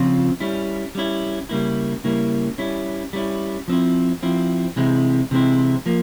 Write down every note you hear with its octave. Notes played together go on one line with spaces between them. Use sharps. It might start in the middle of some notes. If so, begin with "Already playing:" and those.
Already playing: C#3 F3 C4 F4
G3 C#4 E4
G3 C#4 E4
C#3 G3 A#3 E4
C#3 G3 A#3 E4
G3 C#4 E4
G3 C#4 E4
F3 C4 E4
F3 C4 E4
C3 E3 G#3 C4 E4
C3 E3 G#3 C4 E4
F3 A#3